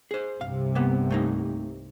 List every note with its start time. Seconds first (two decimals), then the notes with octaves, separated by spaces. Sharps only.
0.11 G#4 C5
0.41 C2 G2 C3 F5
0.75 A#3 B3
1.10 A3 A#3 D#4